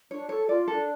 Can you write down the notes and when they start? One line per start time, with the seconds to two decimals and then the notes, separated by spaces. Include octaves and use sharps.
0.10 D4 C#5
0.29 A4 C#5
0.49 F4 D5
0.68 D4 A4